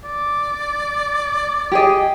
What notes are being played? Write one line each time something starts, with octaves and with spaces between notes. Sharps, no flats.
D5
G4 G#4 D#5